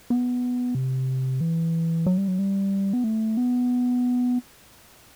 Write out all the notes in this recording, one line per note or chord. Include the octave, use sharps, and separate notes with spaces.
B3
C3
E3
F#3
G3
F#3
G3
B3
A3
B3